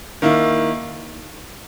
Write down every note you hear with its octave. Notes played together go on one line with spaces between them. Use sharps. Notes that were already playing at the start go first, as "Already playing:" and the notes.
D#3 A#3 E4